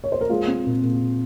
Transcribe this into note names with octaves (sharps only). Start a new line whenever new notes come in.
C#5
C5
A#4
G#3 F4 G#4
C4
A#2
A#2